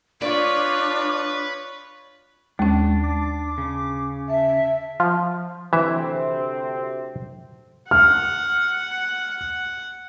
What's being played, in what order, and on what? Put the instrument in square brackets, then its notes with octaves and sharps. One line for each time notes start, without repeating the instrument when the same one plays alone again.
[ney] D4 [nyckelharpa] F4 C#5 [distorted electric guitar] B4 [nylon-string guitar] D5
[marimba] D#2 C#4 [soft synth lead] G#3 [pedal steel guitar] D4
[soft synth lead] D6
[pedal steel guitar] C#3
[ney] E5 [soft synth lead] A5
[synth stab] F3
[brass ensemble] D2 C3 C4 [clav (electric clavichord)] E3 E5
[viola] F#5 [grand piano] F6